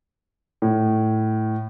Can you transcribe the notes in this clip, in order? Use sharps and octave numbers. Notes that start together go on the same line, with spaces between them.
A2